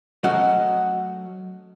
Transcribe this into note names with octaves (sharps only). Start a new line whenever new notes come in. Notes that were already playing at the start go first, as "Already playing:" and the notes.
F#3 A3 C#4 F#4 D#5